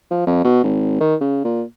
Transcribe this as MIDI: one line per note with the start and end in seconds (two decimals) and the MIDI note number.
0.11 0.26 53
0.27 0.41 41
0.44 0.63 47
0.63 0.96 32
1.00 1.15 51
1.21 1.41 49
1.44 1.62 46